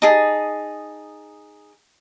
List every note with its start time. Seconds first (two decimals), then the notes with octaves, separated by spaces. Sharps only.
0.02 D#4 G#4 A5